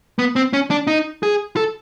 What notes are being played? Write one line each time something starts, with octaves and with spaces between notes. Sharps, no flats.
B3
C4
C#4
D4
D#4
G#4
A4